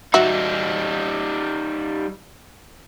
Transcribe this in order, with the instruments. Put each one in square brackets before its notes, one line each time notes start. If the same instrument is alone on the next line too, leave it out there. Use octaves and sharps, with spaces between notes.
[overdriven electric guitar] G3 D#4 [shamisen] F#4 E5